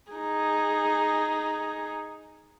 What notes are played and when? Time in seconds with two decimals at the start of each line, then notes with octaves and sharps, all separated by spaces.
0.12 D#4 G#4